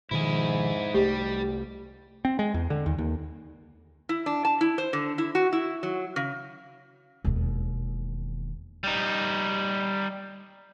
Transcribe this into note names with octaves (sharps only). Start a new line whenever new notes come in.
G#2 B2 D#3 F3 E4 G#4
C2 G3 A3 G4
C4
G#3
E2
D3
D#2
D#2
E4
D4
A5
E4
C5
D3
E4
F#4
E4
F#3
C#3
E1 D#2
G3 D#4